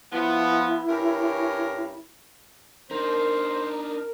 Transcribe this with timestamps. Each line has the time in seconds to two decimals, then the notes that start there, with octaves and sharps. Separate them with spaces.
0.12 F3 B3 E4
0.88 G2 C#4 A#4
2.91 D4 D#4 A#4 C5